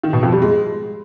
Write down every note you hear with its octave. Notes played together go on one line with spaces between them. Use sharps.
D#3
B2
F2
G3
G#3